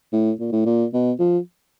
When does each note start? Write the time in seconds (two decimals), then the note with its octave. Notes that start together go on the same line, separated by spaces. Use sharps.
0.13 A2
0.40 A#2
0.52 A2
0.66 A#2
0.94 B2
1.19 F3